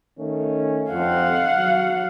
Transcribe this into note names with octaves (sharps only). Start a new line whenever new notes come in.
D#3 A3 C#4
F2 C4 F5 F#5
F#3